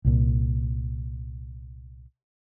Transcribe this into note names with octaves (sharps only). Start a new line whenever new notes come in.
C2 A#2